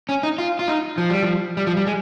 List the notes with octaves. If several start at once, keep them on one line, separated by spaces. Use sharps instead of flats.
C#4
D#4
F4
F4
D#4
F3
G3
F3
G3
F3
G3
G#3